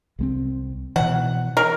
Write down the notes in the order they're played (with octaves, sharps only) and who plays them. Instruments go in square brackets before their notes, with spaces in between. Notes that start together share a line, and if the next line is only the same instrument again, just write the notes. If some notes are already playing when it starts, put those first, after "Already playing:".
[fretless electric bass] C2 G#3 C4
[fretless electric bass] B2 E3 [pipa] F#5
[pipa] A#4